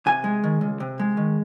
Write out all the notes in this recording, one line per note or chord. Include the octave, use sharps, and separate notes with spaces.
C3 G#5
G#3
D#3
C#2
C3
G#3
D#3